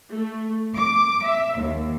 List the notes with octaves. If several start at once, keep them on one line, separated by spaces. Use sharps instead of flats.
A3
D6
E5
D#2